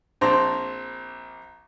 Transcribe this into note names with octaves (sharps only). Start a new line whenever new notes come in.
A#1 C4 D4 A5 A#5 C6